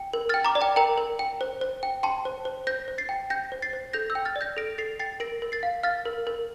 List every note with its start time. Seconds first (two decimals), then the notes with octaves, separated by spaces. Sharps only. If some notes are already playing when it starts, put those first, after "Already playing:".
Already playing: G5
0.13 A#4
0.29 F6 A6
0.34 G5
0.45 A#5 D6
0.55 D5
0.61 G5 A#5
0.76 A#4 G5 A#5
0.98 A#4
1.19 G5
1.41 C5
1.61 C5
1.83 G5
2.03 G5 A5 C6
2.25 C5
2.45 C5
2.67 C5 G6 A#6
2.88 C5
2.98 A6 C7
3.09 G5
3.30 G5 G6 A#6
3.52 C5
3.62 A6 C7
3.73 C5
3.93 A4 G6 A#6
4.10 E6 G6
4.15 G5
4.25 F6 A6
4.36 D5
4.41 G6 A#6
4.57 A4 A#6 D7
4.78 A4 A6 C7
4.99 G5 A6 C7
5.20 A#4 A#6 D7
5.42 A#4
5.52 A6 C7
5.63 F5
5.83 F5 F6 A6
6.05 A#4
6.27 A#4